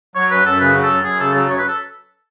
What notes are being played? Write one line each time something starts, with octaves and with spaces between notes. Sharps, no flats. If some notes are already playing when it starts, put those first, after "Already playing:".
F#3 C#5
F#2 B4
F#2 A4
C#3 B4
F#3
A4
F#2
F#2 G#4
C#3 A4
F#3 A4
F#2 C#5
B4
A4